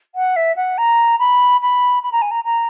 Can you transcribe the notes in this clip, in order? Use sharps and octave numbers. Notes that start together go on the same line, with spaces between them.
F#5
E5
F#5
A#5
B5
B5
B5
A#5
G#5
A#5
A#5